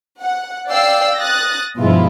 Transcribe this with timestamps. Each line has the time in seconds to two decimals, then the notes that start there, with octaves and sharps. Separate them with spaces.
0.22 F#5
0.68 D5 F5 G5 E6 C7
1.17 D#6 F#6 A6 A#6
1.78 G2 B2 F3 G#3 E4 F4